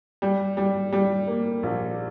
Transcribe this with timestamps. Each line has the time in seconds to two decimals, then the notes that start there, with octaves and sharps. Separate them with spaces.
0.22 G3
0.57 G3
0.93 G3
1.28 A#3
1.63 A#1